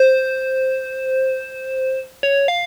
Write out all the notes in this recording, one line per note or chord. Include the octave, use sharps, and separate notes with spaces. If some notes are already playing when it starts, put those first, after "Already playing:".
Already playing: C5
C#5
F5